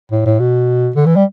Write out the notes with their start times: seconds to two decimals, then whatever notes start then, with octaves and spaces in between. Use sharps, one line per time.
0.12 A2
0.26 A2
0.40 B2
0.96 D3
1.06 E3
1.16 G3